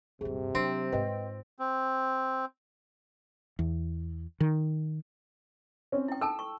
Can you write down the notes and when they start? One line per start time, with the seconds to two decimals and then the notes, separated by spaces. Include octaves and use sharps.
0.21 D#1 G2 C3 G#4
0.55 F#3 C4 D4
0.92 G#2 F4 B4 D#5 G5
1.59 C4
3.59 E2
4.40 D#3
5.92 C4 C#4
6.08 E4 G5
6.21 A4 G5 A5 E6
6.39 C#6